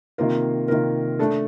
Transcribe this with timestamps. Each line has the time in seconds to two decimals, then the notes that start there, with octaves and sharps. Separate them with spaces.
0.18 C3 D#3 A#3 F4 A#4
0.68 C3 D#3 A#3 F4 A#4
1.19 A3 D4 A4